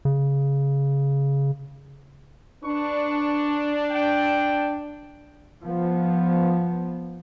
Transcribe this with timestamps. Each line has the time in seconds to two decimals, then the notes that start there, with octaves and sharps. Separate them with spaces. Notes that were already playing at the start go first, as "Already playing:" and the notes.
0.05 C#3
2.64 D4 B4 C#6
3.91 G5
5.63 F3 B3